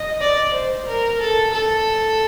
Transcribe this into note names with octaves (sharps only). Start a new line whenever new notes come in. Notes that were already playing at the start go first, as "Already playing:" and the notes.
Already playing: D#5
D5
C5
A#4
A4
A4